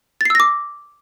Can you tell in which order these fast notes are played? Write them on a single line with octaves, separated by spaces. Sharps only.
A6 C7 E6 A#6 D6